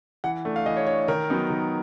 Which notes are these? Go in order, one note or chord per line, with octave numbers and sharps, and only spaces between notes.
E3 F#5
A3 D4
F5
E3 D#5
C#5
A3 D4 C#5
D#3 A#4
F#3 B3 D#4
D#3